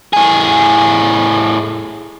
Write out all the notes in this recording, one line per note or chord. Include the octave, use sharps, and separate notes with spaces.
A2 G#4